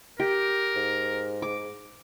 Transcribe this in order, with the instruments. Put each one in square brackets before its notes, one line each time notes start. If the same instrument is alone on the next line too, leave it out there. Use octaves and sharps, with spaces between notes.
[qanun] G4 [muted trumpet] A#4
[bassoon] G#2
[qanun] D6